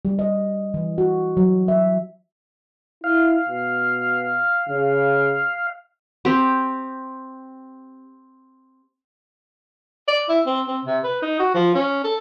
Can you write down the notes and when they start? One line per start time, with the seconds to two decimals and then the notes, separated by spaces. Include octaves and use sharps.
0.05 G3
0.19 D#5
0.74 E3
0.98 F#4
1.37 F#3
1.68 E5
3.04 E4 F5
3.49 B2
4.69 C#3
6.25 C4 G4
10.08 D5
10.29 E4
10.46 C4
10.68 C4
10.85 C3
11.03 B4
11.22 D#4
11.39 F#4
11.54 F3
11.75 C#4
12.04 A4